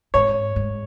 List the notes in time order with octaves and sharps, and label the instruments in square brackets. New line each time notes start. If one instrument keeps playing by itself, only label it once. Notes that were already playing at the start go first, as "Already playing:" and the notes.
[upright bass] G#2 [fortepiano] C#5
[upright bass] G#2